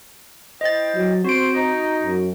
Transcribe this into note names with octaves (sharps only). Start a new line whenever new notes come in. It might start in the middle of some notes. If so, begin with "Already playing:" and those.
E4 C5 D#5 G5 A6
F#3
C4 F#4 C5 D7
D#4
F#2